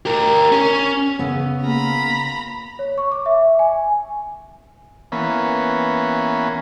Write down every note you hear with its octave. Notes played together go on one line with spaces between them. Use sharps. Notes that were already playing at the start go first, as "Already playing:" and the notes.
G4 A#4
C#4
C#3 B3 B5 E6
A#3 F4 G#4 A#5 B5
C#5
C#6
D6
E5
G#5
E3 A#3 B3 C#4 B5